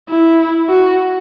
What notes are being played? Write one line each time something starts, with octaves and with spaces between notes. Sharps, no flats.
E4
F#4